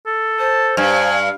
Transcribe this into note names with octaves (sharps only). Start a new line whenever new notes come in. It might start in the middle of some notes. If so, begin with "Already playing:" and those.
A4
C5 A5
G2 F5 G#5